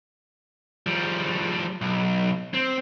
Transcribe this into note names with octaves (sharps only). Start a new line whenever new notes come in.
F3 G3
B1
C4